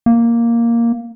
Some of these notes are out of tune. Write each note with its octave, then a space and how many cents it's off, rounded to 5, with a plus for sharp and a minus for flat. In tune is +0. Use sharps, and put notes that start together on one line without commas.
A#3 +0